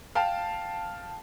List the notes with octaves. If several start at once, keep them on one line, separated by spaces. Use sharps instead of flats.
F5 G5 A5 F6 C7